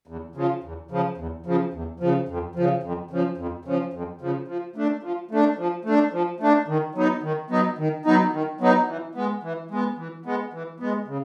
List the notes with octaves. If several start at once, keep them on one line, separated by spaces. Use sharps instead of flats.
E2
C#3 F3
E2
C#3 F3
E2
C#3 F3
E2
C#3 F3
F2
C#3 F3
F2
C#3 F3
F2
C#3 F3
F2
C#3 F3
F3
A3 D4
F3
A3 D4
F3
A3 D4
F3
A3 D4
D#3
F#3 B3 D#4
D#3
F#3 B3 D#4
D#3
F#3 B3 D#4
D#3
F#3 B3 D#4
E3
G#3 B3
E3
G#3 B3
E3
G#3 B3
E3
G#3 B3
C#3